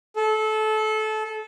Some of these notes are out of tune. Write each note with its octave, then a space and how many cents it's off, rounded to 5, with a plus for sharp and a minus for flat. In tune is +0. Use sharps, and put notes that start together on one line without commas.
A4 -25